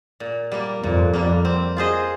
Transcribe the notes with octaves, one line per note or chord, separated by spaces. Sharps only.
A#2
G3 A#3
F2 A#2
G3 A#3
C4
F4 G#4 C5 D#5